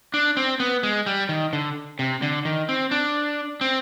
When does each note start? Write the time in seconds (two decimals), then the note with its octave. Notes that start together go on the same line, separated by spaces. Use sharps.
0.14 D4
0.37 C4
0.60 B3
0.83 G#3
1.06 G3
1.29 D#3
1.53 D3
1.99 C3
2.22 D3
2.45 D#3
2.69 C4
2.91 D4
3.61 C4